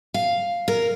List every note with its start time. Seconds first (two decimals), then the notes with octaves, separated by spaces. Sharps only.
0.14 F5
0.68 A#4